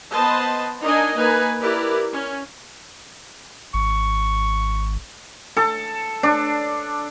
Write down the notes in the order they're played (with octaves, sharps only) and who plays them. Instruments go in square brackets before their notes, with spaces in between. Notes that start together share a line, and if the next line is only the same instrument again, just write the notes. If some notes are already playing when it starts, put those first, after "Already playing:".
[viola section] B3 B4 C5 D#5 A5
D4 D#4 A#4 D#5 G#5
A#3 D#4 B4 G#5
E4 G4 A#4 B4 D5
C#4
[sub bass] G#1 [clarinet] C#6
[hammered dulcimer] A4
D4